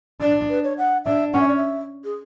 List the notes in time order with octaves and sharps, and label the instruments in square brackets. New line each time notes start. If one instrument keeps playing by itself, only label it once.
[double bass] D4 [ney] D5
[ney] B4
C#5
F#5
[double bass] D4 [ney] E5
[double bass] C#4 [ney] F#5
[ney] E5
D5
E5
G#4